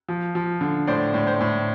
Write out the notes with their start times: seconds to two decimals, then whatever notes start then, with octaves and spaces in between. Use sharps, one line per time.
0.08 F3
0.35 F3
0.61 D3
0.87 A2 C5 D5
1.14 A2
1.27 C5
1.41 A2